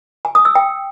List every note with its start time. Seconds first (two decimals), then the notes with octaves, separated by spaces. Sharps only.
0.25 G#5
0.35 D#6
0.45 E6
0.55 G5